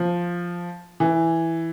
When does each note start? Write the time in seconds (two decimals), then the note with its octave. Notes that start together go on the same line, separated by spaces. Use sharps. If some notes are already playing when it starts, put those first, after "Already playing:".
Already playing: F3
1.00 E3